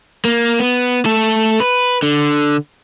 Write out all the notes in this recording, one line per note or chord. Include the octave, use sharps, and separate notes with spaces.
A#3
B3
A3 A4
B4
D3